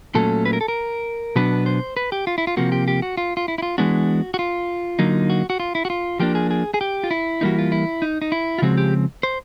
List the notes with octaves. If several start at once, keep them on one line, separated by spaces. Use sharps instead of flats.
A#2 F#3 A3 C#4 A4
B4
A#4
A4
A#4
B2 F#3 B3 D4 B4
C5
B4
G4
F4
E4
F4
C3 F3 A#3 F#4
G4
G4
F#4
F4
F4
E4
E4
F4
E3 G#3 B3 D4 F#4
F#4
F4
D3 F#3 A#3 D#4
F#4
F#4
F4
E4
F#4
F4
F3 A#3 D4 G4
G#4
G#4
G#4
G4
F4
E4
E3 G3 A#3 D#4 F#4
F4
E4
D#4
D#4
E4
F4
C#3 F3 G#3 C4 F#4
G4
C5